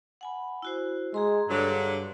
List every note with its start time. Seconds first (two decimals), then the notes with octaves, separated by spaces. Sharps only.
0.21 F#5 G#5 B5
0.62 E4 F#4 C5
1.14 G#3 G#4 A#5 C6
1.49 G2 D3 F#3